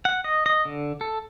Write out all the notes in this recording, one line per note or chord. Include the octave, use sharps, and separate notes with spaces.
F#5
D#5
D#5
D3
A4